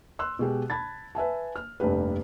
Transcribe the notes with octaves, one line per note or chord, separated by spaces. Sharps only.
C6 E6 F#6
B2 G#3 G4
A5 B5 G#6 A6
B4 E5 G#5 A5
F6
F1 G2 A#3 G4 B4